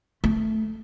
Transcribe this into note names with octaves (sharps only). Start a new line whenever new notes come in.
A3